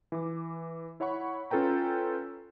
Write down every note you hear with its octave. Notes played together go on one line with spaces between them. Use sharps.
E3 D6
E4 C#5 F#5 B5 C#6
C#4 F4 A4 B4 G5 A#5